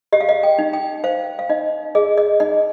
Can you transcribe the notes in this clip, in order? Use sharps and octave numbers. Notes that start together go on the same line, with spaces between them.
G4 D#5
F5
D#5
G5
D#4
G5
C5 F5
F5
D#4 D#5
G#4 D#5
D#5
D#4 D#5